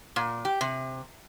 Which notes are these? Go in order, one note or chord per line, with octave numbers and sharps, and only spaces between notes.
A#2
G4
C3